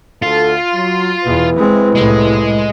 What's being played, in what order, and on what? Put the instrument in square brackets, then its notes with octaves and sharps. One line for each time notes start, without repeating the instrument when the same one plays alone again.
[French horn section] D2 A4 [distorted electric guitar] F4
[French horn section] F#3
[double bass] E2 B2 [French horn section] E4 B4
[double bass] G#3 C4
[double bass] C2 A2 [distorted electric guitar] G#3